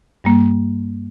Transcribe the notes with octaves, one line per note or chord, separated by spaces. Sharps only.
G2 G3 A#3